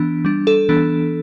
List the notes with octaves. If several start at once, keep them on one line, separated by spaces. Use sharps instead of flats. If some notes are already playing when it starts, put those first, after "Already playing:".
Already playing: E3 B3 D4
G3 D4
A4
E3 B3 D4